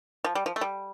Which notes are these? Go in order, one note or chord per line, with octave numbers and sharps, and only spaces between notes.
F3
G3
F3
A3
G3